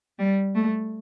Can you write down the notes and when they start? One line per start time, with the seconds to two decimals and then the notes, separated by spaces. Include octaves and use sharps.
0.19 G3
0.55 A3